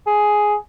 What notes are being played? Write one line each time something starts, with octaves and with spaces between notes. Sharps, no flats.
G#4